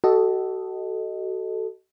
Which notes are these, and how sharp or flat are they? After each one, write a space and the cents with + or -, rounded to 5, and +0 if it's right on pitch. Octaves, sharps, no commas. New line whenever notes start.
F#4 +35 A4 +0 D#5 +0